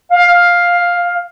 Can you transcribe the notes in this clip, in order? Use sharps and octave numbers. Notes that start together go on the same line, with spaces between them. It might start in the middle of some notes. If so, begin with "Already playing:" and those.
F5